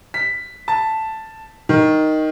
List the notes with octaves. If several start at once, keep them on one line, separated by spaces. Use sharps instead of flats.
B6
A5
D#3